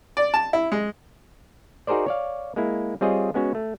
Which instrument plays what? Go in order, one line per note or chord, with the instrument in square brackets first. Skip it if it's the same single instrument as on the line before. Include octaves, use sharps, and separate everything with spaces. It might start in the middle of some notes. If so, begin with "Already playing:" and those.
[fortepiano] D5
A5
E4
G#3
[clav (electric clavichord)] D#4 F#4 G#4 A#4 C5 D5
C#5 D5 F5
G#3 A#3 E4
G3 C4 F4 G#4 C#5 D#5
G#3 B3 C#4 F#4
A3